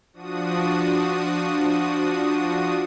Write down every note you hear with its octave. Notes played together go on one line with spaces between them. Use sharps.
F3 D4 F#4 D#6